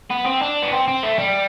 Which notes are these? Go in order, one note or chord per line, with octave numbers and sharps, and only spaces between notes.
B3
C4
D4
B3
C4
C4
A3
G3